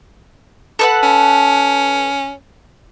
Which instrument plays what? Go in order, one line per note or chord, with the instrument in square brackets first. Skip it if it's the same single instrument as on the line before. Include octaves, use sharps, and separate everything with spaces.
[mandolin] A4 B4 F#5
[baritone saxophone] C#4